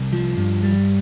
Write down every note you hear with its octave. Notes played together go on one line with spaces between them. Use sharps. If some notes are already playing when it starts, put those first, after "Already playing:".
Already playing: C2
F3
G2
G3